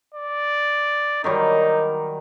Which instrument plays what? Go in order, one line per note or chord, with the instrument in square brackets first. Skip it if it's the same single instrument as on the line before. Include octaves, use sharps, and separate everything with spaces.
[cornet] D5
[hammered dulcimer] D#3 F#3 G3 [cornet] D#4